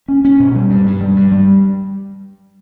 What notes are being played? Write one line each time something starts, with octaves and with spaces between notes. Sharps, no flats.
C#4
C#4
B2
G3
G2
G2
G3
G2
G3